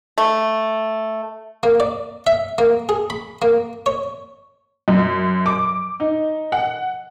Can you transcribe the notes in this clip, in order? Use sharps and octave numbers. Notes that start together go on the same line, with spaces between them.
A3
A#3
D5
E5
A#3
G#4
B5
A#3
C#5
F#2
D6
D#4
F#5